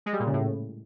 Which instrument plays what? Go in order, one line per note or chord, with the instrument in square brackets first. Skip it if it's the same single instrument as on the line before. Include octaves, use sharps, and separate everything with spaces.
[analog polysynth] G#3
G3
A#2
C#3
A2